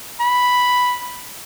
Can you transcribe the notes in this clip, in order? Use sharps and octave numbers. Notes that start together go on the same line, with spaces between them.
B5